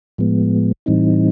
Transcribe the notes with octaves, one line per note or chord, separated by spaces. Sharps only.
A2 F3 G#3 B3
A2 E3 G3 C4 D#4